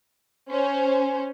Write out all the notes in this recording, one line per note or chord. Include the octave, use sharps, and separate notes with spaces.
C#4 C5